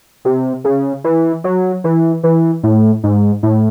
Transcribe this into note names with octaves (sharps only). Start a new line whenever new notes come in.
C3
C#3
E3
F#3
E3
E3
A2
G#2
A2